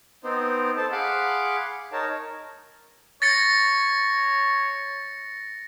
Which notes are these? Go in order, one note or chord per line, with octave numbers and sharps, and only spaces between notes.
B3 C4 D#4 C5
A4 C5 A5
G#4 F5 F#5 B5 C6 D6
D#4 A#4 C#5 A5
C#5 A6 A#6 C#7